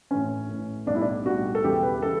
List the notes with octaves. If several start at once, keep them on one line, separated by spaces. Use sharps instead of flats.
A1 A2 E3 C#4
A1 A2 E3
B1 A2 G3 D4
E4
D4
B1 A2 G3 F#4
A4
E1 E2 C#3 E3 G3 G4
B4
C#3 E3 A4